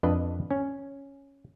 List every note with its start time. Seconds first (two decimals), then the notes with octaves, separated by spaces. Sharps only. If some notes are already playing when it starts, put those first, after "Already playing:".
0.03 F2 D4 B4 D#5
0.51 C#4